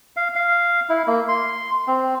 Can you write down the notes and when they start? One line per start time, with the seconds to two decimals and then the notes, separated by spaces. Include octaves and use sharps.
0.17 F5
0.36 F5
0.89 E4
1.07 A#3
1.29 C6
1.87 C4